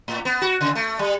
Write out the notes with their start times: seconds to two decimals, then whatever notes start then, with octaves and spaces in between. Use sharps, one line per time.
0.08 A2
0.25 B3
0.42 F#4
0.61 C#3
0.75 A3
0.99 G3